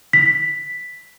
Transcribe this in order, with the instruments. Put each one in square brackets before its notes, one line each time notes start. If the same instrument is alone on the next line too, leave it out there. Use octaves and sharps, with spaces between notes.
[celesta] B6